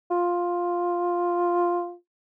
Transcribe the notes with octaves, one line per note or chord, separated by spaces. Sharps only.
F4